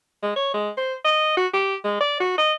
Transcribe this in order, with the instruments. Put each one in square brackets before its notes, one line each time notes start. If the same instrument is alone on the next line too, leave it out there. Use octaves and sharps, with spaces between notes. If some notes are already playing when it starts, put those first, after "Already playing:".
[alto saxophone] G#3
C#5
G#3
C5
D#5
F#4
G4
G#3
D5
F#4
D#5